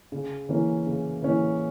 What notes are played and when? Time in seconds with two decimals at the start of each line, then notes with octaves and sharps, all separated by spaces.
0.12 C#3
0.49 E3 A#3 C#4
0.87 C#3
1.22 E3 A#3 C#4